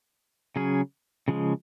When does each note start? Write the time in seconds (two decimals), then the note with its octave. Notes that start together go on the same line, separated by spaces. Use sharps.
0.56 C#3 F#3 C#4 G#4
1.28 C#3 F3 G#3